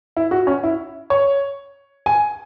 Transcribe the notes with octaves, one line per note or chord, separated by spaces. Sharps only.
E4
F#4
C#4
E4
C#5
G#5